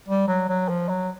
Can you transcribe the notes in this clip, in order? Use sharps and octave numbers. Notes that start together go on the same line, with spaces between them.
G3
F#3
F#3
F3
F#3